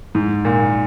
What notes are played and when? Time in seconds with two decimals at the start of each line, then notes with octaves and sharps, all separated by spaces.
0.15 G#2
0.45 A#2